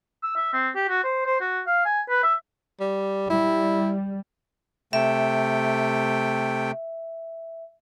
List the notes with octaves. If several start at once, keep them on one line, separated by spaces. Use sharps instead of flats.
E6
E5
C4
G4
F#4
C5
C5
F#4
F5
G#5
B4
E5
G3
G3 E4
C3 A3 E5 G5